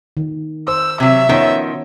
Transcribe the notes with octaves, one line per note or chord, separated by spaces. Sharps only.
D#3
C5 E6
C3 F#3 E5
D#3 F3 B3 C#4 F#4 C#5